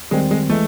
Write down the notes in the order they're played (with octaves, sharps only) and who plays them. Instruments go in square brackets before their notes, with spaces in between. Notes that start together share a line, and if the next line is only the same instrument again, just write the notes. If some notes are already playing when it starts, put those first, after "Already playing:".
[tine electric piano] D#3 G3 C4 [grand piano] G#3
[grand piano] G#3
[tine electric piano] E3 G#3 [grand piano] A3